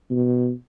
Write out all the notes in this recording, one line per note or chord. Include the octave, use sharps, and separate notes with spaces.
B2